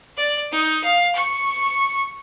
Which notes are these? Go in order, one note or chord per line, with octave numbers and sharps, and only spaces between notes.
D5
D#4
F5
C#6